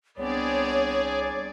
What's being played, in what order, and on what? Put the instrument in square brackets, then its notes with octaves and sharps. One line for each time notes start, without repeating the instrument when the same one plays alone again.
[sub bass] C2 [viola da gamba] B3 C4 D4 [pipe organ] G#4 D5 [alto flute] C#5